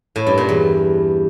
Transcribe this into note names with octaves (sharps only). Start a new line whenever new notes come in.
A2
G2
A#2
E2